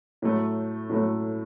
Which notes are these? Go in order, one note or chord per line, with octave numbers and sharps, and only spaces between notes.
A2 F#3 A3
A2 F#3 A3